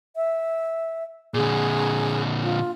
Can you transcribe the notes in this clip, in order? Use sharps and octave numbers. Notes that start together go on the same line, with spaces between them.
E5
A#2 D3 G#4
F4